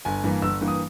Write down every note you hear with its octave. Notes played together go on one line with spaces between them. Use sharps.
G1 G#5
G2 E3 A#3
G1 E6
G2 E3 A#3
D#6